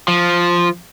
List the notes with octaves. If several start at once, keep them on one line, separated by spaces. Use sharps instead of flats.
F3